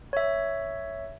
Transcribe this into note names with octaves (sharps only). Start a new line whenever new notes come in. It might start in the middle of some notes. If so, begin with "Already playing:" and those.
C#5 E5